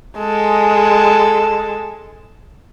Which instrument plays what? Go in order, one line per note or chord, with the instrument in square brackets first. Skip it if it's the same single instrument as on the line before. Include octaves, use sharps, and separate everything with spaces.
[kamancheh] G#3 A4